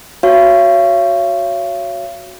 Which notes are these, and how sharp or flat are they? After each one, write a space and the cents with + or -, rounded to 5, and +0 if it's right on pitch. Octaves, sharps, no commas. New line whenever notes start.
F#4 -5 C#5 +0 F5 -45